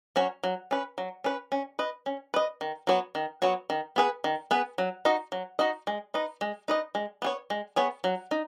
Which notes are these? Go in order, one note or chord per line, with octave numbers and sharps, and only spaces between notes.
F#3 C#4 F#4 C#5
F#3
C#4 B4
F#3
C#4 B4
C#4
B4 D#5
C#4
B4 D#5
D#3
F#3 B3 F#4 C#5
D#3
F#3 B3 F#4 C#5
D#3
B3 G#4 B4
D#3
B3 G#4 B4
F#3
D#4 F#4 D#5
F#3
D#4 F#4 D#5
G#3
D#4 B4 D#5
G#3
D#4 B4 D#5
G#3
B3 G#4 C#5
G#3
B3 G#4 C#5
F#3
D#4